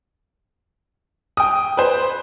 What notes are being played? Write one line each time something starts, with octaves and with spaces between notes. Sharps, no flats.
G5 D#6
B4 C5